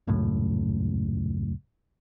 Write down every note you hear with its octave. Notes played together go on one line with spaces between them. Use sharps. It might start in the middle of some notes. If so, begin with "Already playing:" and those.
D#1 C#2 F#2 A2